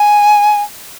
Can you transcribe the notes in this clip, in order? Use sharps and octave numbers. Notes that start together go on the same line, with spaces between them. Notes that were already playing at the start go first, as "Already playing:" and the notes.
Already playing: G#5